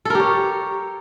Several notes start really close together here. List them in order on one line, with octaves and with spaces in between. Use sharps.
A4 A#4 G4 C#5